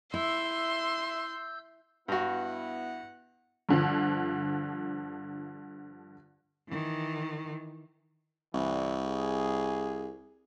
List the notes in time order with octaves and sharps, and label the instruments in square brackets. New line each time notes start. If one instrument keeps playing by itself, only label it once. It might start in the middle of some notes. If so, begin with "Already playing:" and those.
[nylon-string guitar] E4 [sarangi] E5 [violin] C6 [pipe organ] E6 G6
[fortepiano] G2 F#4 [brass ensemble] B3 E4 F#5
[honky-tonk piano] G2 D3 F3
[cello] D#3 E3
[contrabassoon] C2 [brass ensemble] G2 D3 E3
[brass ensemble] G#4